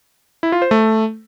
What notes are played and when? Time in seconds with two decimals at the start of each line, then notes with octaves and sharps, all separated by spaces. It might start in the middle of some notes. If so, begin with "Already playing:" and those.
0.43 E4
0.52 F4
0.62 C5
0.71 A3